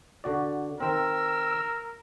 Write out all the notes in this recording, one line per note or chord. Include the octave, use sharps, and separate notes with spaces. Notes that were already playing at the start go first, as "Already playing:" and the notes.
D3 F#4 D5
D#3 C4 A#4 E6